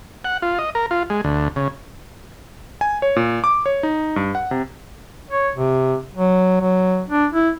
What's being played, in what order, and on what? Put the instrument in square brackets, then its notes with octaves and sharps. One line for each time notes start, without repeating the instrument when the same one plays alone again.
[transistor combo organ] F#5
F4
D#5
A#4
F4
G#3
D2
C#3
[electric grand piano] G#5
C#5
A#2
D6
C#5
D#4
G2
F#5
C3
[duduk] C#5
C3
F#3
F#3
D4
E4